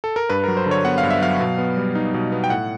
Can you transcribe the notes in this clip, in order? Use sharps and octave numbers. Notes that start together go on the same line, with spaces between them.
A4
A#4
G2 B4
F#3 A#4
C5
D3
C#5
B3 F#5
F5
G2
E5
F#3 F5
B2
B3
G3
D#4
B2
B3
G5
A2 F#5